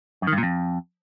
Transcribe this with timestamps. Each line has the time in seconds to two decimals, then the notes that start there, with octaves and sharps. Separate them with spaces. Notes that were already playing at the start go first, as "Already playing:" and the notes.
0.22 F#2
0.27 D#3
0.33 G2
0.38 A#2
0.43 F2